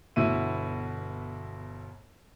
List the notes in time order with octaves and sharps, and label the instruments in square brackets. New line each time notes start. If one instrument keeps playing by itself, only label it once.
[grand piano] G1 B2 E4 E5 D#7